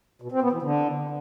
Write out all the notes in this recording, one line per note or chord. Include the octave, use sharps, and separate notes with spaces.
B2
C4
B3
E3
D3